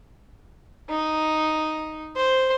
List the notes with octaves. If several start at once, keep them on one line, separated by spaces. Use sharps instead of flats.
D#4
C5